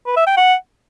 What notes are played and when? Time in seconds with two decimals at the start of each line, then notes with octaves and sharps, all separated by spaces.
0.06 B4
0.16 E5
0.27 G5
0.37 F#5